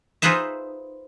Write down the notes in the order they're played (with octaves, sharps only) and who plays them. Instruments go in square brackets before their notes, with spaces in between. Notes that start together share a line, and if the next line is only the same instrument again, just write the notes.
[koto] D#4 F4 G#4 B4 C5 E5